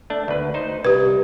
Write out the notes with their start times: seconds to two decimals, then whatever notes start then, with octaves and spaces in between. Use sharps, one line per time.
0.10 A3 D4
0.28 D2 B4
0.54 D#4 C5
0.85 C2 G4 B4